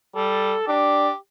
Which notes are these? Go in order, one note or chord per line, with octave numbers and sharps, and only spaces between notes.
G3 A4
D4 G4